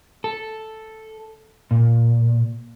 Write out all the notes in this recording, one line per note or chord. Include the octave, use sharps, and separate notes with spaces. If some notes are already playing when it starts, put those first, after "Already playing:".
A4
A#2